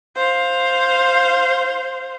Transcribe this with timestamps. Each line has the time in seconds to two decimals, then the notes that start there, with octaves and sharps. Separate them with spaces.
0.15 C5 F5